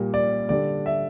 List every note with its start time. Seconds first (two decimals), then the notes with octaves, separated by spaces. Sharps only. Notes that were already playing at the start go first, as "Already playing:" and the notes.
Already playing: A#2 G3 A#3
0.14 D5
0.49 D3 G3 D4 D5
0.86 E5